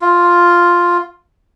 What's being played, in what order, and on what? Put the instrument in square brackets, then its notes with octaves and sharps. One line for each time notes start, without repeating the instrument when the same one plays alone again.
[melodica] F4